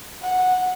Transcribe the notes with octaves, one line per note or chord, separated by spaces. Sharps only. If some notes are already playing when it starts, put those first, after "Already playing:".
F#5